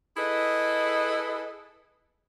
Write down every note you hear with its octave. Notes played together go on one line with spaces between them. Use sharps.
E4 G#4 A4 B4 D#5